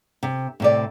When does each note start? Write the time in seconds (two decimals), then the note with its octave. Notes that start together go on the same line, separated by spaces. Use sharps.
0.23 C3
0.60 A2 C3 D5